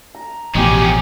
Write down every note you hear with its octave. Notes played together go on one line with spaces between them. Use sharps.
A#5
A1 B2 F3 G#3 C#4 G4 G#4 D#5